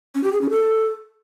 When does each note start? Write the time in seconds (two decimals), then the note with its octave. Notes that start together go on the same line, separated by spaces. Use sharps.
0.15 C#4
0.24 G4
0.32 G#4
0.41 C#4
0.50 A4